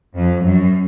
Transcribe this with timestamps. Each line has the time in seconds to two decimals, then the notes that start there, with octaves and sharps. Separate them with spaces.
0.16 F2
0.45 F#2